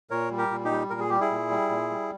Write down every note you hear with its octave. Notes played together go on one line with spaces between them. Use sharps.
A#2 A#4 C#5
G3
G4 A#4
A#2
D#4 G4
G3
A#2 A#4
G#4
G3 G4
E4 G#4
A#2
G3
A#2
G3